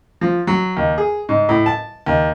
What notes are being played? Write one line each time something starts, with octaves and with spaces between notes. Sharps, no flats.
F3
F#3
D#2
G#4
G#2
A2
A5
D#2